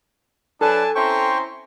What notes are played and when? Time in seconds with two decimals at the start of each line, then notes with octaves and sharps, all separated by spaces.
0.61 F#3 D4 A4 B4 G#5 A5
0.95 C4 C#4 E4 C5 G5 A#5 C6 C#6